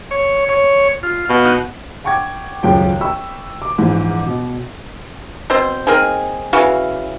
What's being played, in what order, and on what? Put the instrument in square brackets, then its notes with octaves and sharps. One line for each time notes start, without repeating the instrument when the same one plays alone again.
[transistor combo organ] C#5
C#5
F4
[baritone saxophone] B2 [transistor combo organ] F5
[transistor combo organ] D#4 F#5
[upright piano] F#5 G5 C#6 D6 G#6
D#1 C#2 F#2 G5
G5 B5 C#6 E6
D6
A#1 G#2 E3
B2
[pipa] B2 C4 C5
A#3 C4 D#4 G#4
C#3 E3 F#4 F5